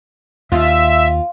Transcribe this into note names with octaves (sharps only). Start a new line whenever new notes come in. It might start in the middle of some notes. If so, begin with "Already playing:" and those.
D#2 F4 E5